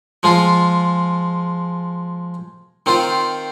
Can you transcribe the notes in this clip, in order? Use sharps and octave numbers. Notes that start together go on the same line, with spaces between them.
F3 G#3 F4
D#3 C4 F4